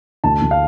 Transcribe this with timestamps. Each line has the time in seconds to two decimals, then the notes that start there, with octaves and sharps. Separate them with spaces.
0.24 D2 A5
0.42 D2
0.51 F5